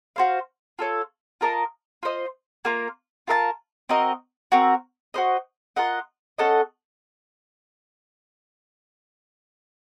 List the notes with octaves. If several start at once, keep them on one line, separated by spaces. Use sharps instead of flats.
F#4 C5 F5
F4 A4 C#5
F4 A#4 D#5 A5
F4 C5 D#5
A#3 F4 A#4
F4 A#4 F5 A5
C4 F#4 A#4 D#5
C4 F#4 A#4
F#4 C5 D#5
F4 A#4 D#5 F#5
C#4 A4 D#5 F#5